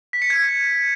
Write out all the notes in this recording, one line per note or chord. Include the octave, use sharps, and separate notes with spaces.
B6
C#7
G#6